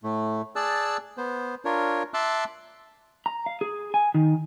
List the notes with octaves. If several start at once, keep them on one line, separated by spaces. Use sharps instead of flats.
A2 A3
G#4 D5 A5 E6 F#6
B3 C5
D4 F4 A#4 C#5
E5 A5 C6 D6 E6 F#6
A#5
F5
G#4
G#5
D#3